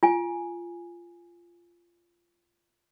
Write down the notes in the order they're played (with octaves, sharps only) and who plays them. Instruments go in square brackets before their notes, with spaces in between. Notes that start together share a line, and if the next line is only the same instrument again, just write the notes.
[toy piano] F4 G#5